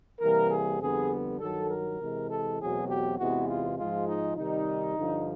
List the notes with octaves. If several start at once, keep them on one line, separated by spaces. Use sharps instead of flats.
C3 E3 G3 A#3 A#4
G#4
F2 D3 G3 B3 G#4
G2 D#3 F#3 A4
A#4
C3 E3 G#3
A4
E2 B2 F#3 A3 C4 G#4
G4
E2 C3 E3 G#3 B3 F#4
F4
G#2 F3 G#3 F4
D#4
C3 D#3 G3 D#4
G2 D3 F3